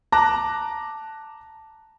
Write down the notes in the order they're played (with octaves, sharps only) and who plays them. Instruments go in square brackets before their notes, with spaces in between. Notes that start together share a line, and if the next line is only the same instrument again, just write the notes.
[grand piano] A5 A#5 D6 F#6 A#6